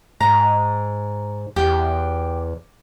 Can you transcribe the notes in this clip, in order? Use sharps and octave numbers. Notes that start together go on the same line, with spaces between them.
G#2 A#5
E2 G4